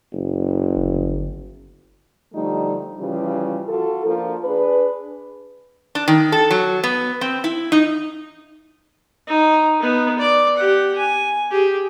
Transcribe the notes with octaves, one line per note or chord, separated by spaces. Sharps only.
F#1
G1
D3 F3 G3 A3 D#4
C#3 E3 F3 G3
F4 F#4 A4
F3 A#3 D4 F4 A#4
D4 G#4 B4
D4
D#3
A4
F#3
B3
C4
E4
D#4
D#4
B3 D#4
D5 D6
G4 F#5
G#5
G4 G#4